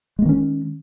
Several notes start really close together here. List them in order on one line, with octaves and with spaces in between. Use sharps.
G#3 A#3 D#3 C#4